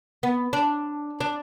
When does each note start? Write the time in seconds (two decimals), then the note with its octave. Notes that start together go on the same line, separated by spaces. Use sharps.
0.23 B3
0.53 D4
1.20 D4